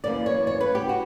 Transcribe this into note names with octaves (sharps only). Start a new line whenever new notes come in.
F#2 C#3 E3 A#3 D5
C#5
C#5
B4
G4
F#4